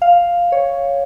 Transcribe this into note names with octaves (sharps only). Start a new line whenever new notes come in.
F5
C#5